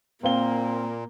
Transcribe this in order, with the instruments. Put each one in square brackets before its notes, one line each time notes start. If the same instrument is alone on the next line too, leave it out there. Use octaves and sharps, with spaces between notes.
[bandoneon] A#2 [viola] A#3 [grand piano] C4 F5 G7